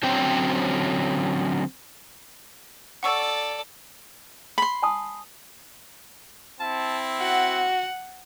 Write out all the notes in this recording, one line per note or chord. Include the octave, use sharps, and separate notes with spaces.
D3 F#3 C4 C#4 C5 G5
A4 D5 F#5 C#6 E6
B5 C6
G#5 A5 D#6
C4 E4 A5
F#4 F#5